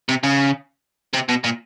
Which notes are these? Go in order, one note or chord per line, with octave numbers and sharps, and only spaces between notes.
C3
C#3
C3
B2
A#2